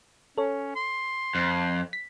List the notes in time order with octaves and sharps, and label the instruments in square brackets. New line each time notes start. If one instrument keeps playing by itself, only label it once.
[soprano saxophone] C#4 [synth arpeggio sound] A4 C#5
[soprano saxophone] C6
[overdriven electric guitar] F2
[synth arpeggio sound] B6